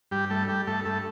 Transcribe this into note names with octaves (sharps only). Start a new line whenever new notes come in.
G2 G3 G4
G3 A3 A4
G3 G4
G2 A3 A4
G2 A3 A4